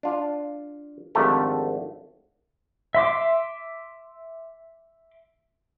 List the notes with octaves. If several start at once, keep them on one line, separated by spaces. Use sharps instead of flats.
D4 F4
G#1 D3 F3 A3 G4
E5 C6 D6